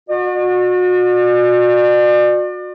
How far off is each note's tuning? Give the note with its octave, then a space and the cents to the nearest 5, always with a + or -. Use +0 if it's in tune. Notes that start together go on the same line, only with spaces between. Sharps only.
F#4 -35 D5 +40